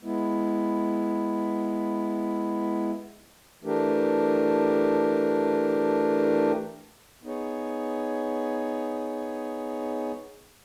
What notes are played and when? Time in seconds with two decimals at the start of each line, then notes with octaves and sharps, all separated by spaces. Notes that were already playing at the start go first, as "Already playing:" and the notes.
0.03 G#3 B3 E4
3.64 E3 A3 D4 G4 A#4
7.23 B3 D#4 G#4 C#5